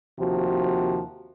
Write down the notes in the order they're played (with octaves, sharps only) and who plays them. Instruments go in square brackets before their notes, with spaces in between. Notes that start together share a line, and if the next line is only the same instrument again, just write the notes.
[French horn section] D#2 C3 F3 F#4